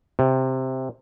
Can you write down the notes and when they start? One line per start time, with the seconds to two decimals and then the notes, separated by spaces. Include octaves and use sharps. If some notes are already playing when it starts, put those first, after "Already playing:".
0.19 C3